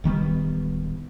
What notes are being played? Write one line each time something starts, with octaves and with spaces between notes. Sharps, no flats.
D1 D#3 G3 B3